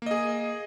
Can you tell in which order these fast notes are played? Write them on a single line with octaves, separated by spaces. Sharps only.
A#3 D#5 G#4